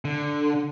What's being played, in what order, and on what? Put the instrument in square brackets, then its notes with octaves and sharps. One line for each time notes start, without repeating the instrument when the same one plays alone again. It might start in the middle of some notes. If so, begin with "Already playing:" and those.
[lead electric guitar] D3